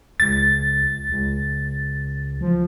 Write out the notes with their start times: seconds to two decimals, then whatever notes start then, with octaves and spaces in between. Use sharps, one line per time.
0.20 C#2 A6
1.10 C#2
2.41 F3